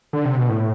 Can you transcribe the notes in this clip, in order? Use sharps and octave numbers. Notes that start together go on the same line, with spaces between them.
D3
C3
B2
A2